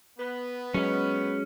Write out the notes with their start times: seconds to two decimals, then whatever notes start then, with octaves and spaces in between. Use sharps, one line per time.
0.18 B3 B4
0.74 F#3 G#3 C#4